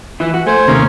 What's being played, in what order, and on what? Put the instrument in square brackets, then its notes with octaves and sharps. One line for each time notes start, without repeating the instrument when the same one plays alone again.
[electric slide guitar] E3 E4
F#4
[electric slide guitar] A3 [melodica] C5 [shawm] G#5
[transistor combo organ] D#2 C3 A#3 [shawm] C#4